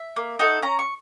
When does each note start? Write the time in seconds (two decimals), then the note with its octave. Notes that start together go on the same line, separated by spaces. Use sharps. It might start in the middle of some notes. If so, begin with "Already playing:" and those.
Already playing: E5
0.16 A#3
0.39 D#4 F#4 A4
0.62 C#4 A#5
0.79 C#6